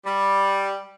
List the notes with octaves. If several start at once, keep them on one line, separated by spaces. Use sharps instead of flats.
G3